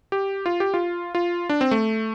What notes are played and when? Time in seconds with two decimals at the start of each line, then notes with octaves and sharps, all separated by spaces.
0.12 G4
0.46 F4
0.60 G4
0.74 F4
1.15 F4
1.49 D4
1.61 C4
1.71 A3